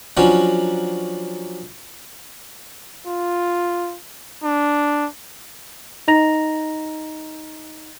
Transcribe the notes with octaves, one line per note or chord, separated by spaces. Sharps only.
F3 F#3 C#4 D4
F4
D4
D#4 D#5 A#5 A#6 F7